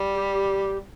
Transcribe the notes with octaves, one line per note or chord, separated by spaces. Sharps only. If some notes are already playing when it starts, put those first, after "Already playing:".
Already playing: G3
G4